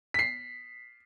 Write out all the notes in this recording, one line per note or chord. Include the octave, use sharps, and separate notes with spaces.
B6 C7